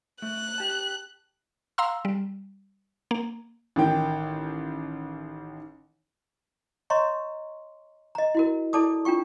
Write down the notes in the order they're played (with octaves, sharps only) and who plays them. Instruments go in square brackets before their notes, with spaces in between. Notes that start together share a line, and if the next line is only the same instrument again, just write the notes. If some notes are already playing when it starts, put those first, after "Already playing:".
[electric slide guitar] A3 [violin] F#6
[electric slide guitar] G4 A5
[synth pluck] F5 A#5 C6 E6
G3
A#3
[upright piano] A1 D#3 G5
[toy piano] C#5 D#5 A#5 C6 C#6
D#5 A#5
E4 F#4 A#4
E4 A4 D5 A5 D6 D#6
D4 F4 G5 C#6